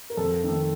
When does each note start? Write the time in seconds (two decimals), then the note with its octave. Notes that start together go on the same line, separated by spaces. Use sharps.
0.10 A#4
0.17 F2 A4
0.44 D#3 A3